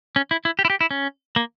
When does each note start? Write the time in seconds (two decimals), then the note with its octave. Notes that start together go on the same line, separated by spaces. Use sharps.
0.16 C#4
0.31 E4
0.45 E4
0.59 G4
0.65 E4
0.70 G4
0.81 E4
0.91 C#4
1.36 A#3